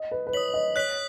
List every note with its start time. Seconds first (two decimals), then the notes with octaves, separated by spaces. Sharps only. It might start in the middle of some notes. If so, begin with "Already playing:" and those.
Already playing: D#5
0.11 B4
0.27 B4
0.33 C#5 D#6 B6 F#7
0.54 D#5
0.75 C#5 F#6 B6 F#7